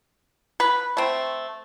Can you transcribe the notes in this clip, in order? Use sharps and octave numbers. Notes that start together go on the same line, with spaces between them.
B4
A3 C4